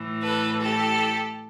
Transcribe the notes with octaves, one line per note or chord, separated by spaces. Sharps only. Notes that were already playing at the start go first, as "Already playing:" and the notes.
Already playing: A2 E3
A4 B4
G4 A4